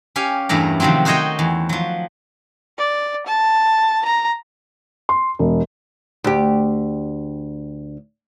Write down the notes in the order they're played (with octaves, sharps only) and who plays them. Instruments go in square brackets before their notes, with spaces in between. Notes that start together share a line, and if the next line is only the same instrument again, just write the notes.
[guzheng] C#4 G4 F5 G#5
E2 G2 A3 A#4
C3 D#3 F3 F#3 C4
D#4 F#4 C5 C#5 D#5 G5
E2
F3 F#3
[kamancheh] D5
A5
A#5
[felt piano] C6
E1
[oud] D2 G4